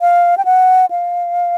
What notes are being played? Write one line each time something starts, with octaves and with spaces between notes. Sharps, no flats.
F5
G5
F#5
F5